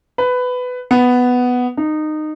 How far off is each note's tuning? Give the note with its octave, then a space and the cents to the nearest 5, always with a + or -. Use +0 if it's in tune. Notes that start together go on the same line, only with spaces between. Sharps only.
B4 +15
B3 +5
D#4 -20